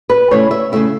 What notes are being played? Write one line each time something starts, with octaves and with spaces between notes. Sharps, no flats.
B4
C#3 A3 E4 C#5
E5
C#3 A3 E4 E5